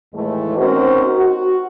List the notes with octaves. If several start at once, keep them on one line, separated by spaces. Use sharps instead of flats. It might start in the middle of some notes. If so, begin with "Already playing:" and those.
D#2 A2 E3 G#3 A3
C4 C#4 D#4 F#4 A#4 C5
F#4